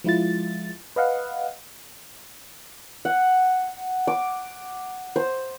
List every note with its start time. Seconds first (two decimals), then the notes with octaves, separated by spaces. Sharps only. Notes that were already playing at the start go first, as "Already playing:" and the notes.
0.04 F3 G#3 E4 F4 A6
0.96 B4 D#5 F5 F#5
3.05 F#5
4.07 D6
5.16 C5